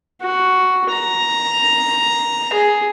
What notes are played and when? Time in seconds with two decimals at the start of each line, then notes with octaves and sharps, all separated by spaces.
0.22 F#4
0.90 A#5
2.53 G#4